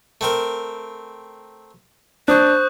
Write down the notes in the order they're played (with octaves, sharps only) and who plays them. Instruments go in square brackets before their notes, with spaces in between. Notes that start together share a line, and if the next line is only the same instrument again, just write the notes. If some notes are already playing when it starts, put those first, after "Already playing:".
[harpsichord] A3 C4 A#4
[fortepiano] D4 [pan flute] C5 [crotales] C#6 D#6 F#6